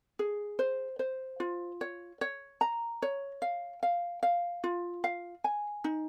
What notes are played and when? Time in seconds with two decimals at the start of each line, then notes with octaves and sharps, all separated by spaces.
0.19 G#4
0.59 C5
0.99 C5
1.40 F4
1.81 C#5
2.21 C#5
2.61 A#5
3.02 C#5
3.42 F5
3.83 F5
4.23 F5
4.64 F4
5.04 F5
5.44 G#5
5.84 D#4